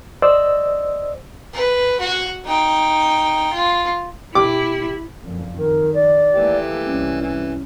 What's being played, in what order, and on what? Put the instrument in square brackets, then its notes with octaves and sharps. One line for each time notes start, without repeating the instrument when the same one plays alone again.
[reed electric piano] C5 D5 D#5 E6
[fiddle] B4
F#4
D#4 G5
F4
[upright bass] B2 [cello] E4 [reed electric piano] G4 [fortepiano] D6
[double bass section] F#1 F2 A#2
[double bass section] D#3 [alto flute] A#4
[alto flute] D5
[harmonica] E3 G4 [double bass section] A3 A#3
[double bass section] C2 [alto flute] C#4
[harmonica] E3